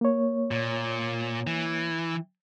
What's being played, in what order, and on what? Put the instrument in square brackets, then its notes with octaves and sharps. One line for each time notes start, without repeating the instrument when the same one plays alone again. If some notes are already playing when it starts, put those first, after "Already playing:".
[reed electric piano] A#3 C#5
[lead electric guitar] A#2
E3